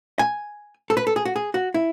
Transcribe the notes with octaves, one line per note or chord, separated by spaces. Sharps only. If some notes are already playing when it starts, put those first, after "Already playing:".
G#5
A4
B4
A4
G#4
F#4
G#4
F#4
E4